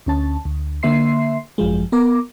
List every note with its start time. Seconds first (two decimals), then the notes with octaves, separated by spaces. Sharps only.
0.06 D2 C#4 A5
0.45 D2
0.83 D3 A#3 E5 C6 C7
1.58 G#1 F#2 F3 G#3
1.92 B3 A#4 D6